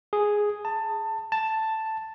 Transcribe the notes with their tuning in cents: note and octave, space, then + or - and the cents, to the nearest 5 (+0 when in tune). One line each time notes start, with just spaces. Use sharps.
G#4 +0
A5 +20
A5 +5